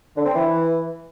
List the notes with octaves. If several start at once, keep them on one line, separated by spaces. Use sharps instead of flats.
D3
C4
E3